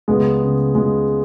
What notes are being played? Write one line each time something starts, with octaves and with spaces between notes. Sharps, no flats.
C#2 G#3 B3
C#3
C#2 G#3